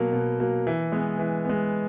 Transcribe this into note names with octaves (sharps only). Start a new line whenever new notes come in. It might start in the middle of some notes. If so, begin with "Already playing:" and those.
Already playing: B2 F#3 A#3
B2
F#3 A#3
E3
G#3 B3
E3
G#3 B3